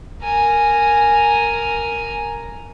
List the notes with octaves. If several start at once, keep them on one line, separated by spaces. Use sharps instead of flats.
A#4 G#5